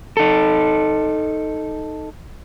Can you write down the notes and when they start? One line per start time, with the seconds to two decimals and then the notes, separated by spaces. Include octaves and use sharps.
0.17 D#4 A4